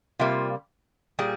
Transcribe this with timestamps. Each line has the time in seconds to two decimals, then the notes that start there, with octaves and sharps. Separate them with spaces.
0.19 C3 G3 A#3 F4
1.19 A#2 G3 G#4